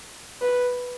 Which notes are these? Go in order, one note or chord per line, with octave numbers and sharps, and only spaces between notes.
B4